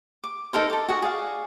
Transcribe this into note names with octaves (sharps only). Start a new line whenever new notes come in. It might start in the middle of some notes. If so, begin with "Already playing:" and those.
D6
D#4 A4 A#4 C5
A4 D6
F#4 G#4 F#5
G#4 D5 F5